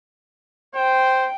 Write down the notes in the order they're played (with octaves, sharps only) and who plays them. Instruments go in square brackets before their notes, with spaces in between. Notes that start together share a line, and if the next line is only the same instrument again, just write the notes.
[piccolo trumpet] C5 [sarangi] G5